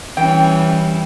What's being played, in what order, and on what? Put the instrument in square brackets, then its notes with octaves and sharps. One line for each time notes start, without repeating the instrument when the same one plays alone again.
[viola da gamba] E3 G3 C#4 [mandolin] G5